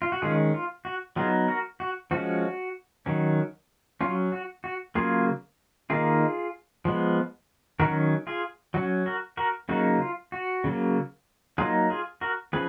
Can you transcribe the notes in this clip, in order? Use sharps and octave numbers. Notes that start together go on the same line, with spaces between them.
F4
F#4
D#3 G#3 C#4 F4 G#4
F4
F#4
F#3 B3 D#4 F4 G#4
F#4 A#4
F#4
F3 G#3 C#4 F#4
D#3 F#3 C#4
F#3 C#4 F4
F#4
F#4
C#3 F#3 A#3 F4 G#4
D#3 A#3 D#4 F4 G#4
F3 G#3 B3
D#3 F#3 C#4 F#4 A#4
F4 G#4
F#3 C#4 F#4
F#4 A#4
F#4 A#4
C#3 F#3 A#3 D#4 F#4
F4
F#4
C#3 F#3 A#3
F#3 A#3 D#4 F4 G#4
F4 G#4
F#4 A#4
C#3 F3 G#4 B4